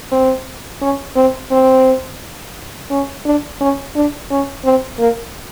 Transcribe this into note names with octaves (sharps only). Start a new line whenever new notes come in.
C4
C#4
C4
C4
C#4
D4
C#4
D4
C#4
C4
A#3